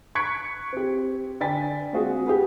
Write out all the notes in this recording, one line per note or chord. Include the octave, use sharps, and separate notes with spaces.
C#6 F#6 G#6 B6 C#7 D7
C4 G4
D3 D5 G5 G#5 A6 B6
G#3 C4 F4 F#4 G#4
G4 G#4 B4